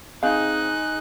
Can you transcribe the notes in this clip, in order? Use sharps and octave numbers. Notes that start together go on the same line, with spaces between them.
G#3 C4 D#4 F5 F#6